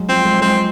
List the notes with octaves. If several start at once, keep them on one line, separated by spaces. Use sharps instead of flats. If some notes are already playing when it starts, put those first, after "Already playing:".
Already playing: F#3 G#3
F3 C4
G#3
G#3 C4